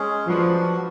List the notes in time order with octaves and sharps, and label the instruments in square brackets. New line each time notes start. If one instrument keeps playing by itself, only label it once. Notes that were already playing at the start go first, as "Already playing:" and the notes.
Already playing: [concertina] G#3 C#4 G#4
[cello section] F3 [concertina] D4 F#4 B4 F#5